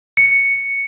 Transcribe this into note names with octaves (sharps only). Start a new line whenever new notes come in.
C#7